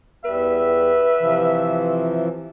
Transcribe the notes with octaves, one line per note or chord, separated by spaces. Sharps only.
E2 G3 B4 E5
C3 E3 F3